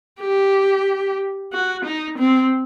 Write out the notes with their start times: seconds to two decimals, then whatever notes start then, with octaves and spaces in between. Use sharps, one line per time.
0.21 G4
1.53 F#4
1.85 D#4
2.19 C4